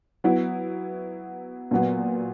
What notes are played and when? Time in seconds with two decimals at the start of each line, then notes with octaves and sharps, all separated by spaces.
0.24 F#3 B3 E4
1.71 A#2 F#3 B3